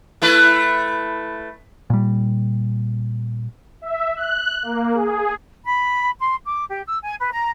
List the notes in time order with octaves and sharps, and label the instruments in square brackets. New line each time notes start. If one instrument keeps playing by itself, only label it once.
[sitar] A3 E4 B4
[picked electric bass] A#2 G3
[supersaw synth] E5
F#6
A#3
G#4
[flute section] B5
C6
D6
G4
E6
G#5
B4
A#5